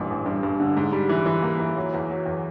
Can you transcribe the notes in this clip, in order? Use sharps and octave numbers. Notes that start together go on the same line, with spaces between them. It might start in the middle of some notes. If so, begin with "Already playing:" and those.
Already playing: A1 G2 A#2
A1
G2
G2
D3
G#2
G3
E3
E3
A#3
E3
F#3
E2
F#3
E2